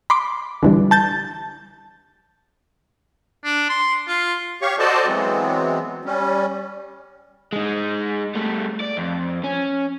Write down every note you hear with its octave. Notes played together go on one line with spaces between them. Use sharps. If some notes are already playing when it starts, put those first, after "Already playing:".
B5 C6 D6
D3 E3 G3
A5 G6 A6
D4
C6
F4
G4 C#5 F5 C#6
F#4 A4 C5 D5 D#5 A5
E3 F#3 G#3 B3 C4
G3 C#4
G#3 D#4
G3 A3
D5
F2
C#4